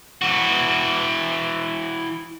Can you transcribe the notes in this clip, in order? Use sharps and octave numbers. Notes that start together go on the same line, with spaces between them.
E3 F#4